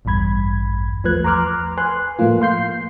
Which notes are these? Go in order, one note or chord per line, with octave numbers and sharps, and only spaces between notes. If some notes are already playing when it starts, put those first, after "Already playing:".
A1 E2 G2 B5 G#6
E2 F3 A3 B4 F#6 G#6
A#5 C6 D6 F6 F#6
B4 G#5 C6 F#6
A2 F3 A3 A#3 F4
F5 C6 G6 C7